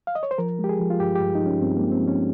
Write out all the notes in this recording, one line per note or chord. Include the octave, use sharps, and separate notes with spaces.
F5
D#5
C#5
C5
F3 A#4
G#3
G4
G#4
F3
F4
G2 G4
G4
G2
D#4
F3 C#4
G2 C4
A#3
G#3
C4
F3
C#4